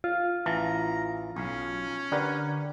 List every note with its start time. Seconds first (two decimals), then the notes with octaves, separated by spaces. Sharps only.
0.04 F4
0.46 A1 E3 A5 A#5
1.36 B1 C#4
2.12 D3 G4 A#4 B4